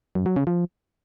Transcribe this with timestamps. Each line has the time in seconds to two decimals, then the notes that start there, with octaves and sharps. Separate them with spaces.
0.15 F#2
0.26 F#3
0.36 C#3
0.47 F3